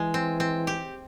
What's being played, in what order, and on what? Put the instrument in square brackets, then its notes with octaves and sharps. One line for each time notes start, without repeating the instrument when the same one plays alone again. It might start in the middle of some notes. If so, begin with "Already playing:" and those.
Already playing: [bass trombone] E3 [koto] G#3
[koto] C4
C4
G4